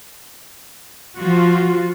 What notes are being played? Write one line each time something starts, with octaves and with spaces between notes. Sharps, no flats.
F3 F4 F#4